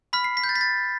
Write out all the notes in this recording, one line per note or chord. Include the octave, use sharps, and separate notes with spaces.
B5 F6 B6
C7
B6
G6
A6
B6
A6